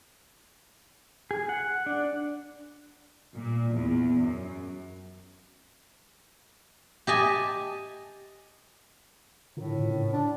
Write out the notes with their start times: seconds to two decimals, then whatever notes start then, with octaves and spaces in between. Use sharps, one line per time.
1.31 G#4
1.49 F#5
1.86 D4
3.33 A#2
3.72 E2
4.17 F#2
7.07 G4 D#5 G#5 A5
9.57 A2 D3 F4 A#4
9.76 G#2 C#3
10.13 D4